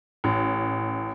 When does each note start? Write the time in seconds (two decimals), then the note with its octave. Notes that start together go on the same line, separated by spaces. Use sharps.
0.24 A1